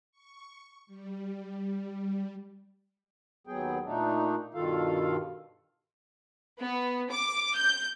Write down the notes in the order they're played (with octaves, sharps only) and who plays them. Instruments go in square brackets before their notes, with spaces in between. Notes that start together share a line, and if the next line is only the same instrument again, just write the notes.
[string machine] C#6
G3
[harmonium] D#2 F#3 B3 G#4 G5
A#2 A3 D4 D#4
G2 B2 D#3 F4 A4 F5
[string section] B3
D6
G6